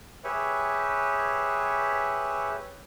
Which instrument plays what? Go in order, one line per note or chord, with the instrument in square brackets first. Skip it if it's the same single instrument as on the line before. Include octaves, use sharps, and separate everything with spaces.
[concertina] G4 G#4 B4 C#5 E5